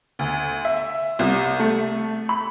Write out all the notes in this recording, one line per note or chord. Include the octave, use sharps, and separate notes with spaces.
D2
E5
C2
A3
B5